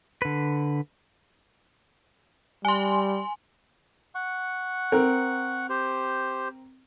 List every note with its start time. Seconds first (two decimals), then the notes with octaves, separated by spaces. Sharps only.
0.22 D3 B4
2.65 G3 G#5 C6
4.15 F#5 C#6
4.92 C4 A#4
5.69 G4 C5